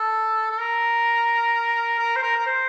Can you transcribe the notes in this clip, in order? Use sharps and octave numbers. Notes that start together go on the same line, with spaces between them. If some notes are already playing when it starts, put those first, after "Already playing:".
Already playing: A4
A4
A#4
A#4
C5
A#4
A#4
C5